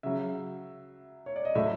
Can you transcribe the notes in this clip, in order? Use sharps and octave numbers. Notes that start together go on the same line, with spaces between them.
C#3 F#3 E5
C#5
D5
D#5
A2 F#3 E5